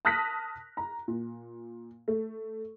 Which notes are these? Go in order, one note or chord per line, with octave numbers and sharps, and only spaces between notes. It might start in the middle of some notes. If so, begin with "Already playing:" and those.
A5 D#6 F6 F#6 A#6 B6
A#5
A#2
A3